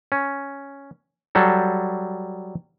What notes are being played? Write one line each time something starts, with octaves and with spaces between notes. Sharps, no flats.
C#4
F#3 G3 A4